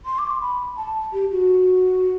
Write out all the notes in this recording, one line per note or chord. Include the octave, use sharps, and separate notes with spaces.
C6
D6
C6
B5
A5
G4
F#4